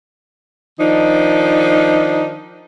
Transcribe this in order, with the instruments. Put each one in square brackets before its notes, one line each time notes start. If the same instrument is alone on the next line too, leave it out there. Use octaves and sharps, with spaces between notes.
[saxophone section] D#3 F3 D4 D#4